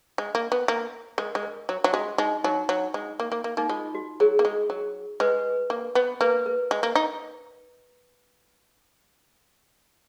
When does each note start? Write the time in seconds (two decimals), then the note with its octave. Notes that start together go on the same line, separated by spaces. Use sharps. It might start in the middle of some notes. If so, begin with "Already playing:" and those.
0.18 G#3
0.35 A#3
0.52 B3
0.68 A#3
1.18 G#3 A#4
1.35 G#3
1.43 A#4
1.69 F#3
1.84 F#3
1.93 G#3 F#4
2.18 G#3 D#4
2.44 F#3 D#4
2.69 F#3
2.94 G#3
3.20 A#3
3.32 A#3
3.44 A#3
3.57 A#3 D#4
3.69 G#3 F4
3.95 F#4
4.20 F#3 G#4
4.39 A#3
4.45 G#3
4.70 F#3
5.20 G#3 B4
5.70 A#3
5.95 B3
6.21 A#3 B4
6.46 A#4
6.71 G#3
6.83 A#3
6.95 D#4